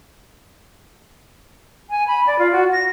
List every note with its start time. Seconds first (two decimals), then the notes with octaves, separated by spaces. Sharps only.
1.90 G#5
2.07 B5
2.27 D5
2.39 F4
2.52 F#4
2.72 A#6